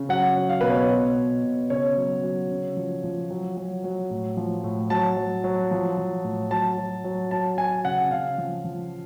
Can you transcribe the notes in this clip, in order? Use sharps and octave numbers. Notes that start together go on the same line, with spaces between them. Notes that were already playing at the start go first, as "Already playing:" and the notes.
Already playing: C#3
F#3 F#5
F#3
F5
B2 B4
C#5
B2
B2
B2
C#3 C#5
F#3
F#3
C#3
F3
F3
F#3
F#3
F#3
A2
F3
A2
F#3 A5
F#3
F#3
F3
F3
A2
F#3 A5
F#3
F#3
F#3 A5
F#3 G#5
C#3 F#5
C#3 F5
F3
F3